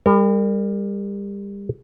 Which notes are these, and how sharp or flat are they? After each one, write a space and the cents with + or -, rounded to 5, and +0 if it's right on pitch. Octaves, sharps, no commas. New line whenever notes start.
G3 +35 A#4 -35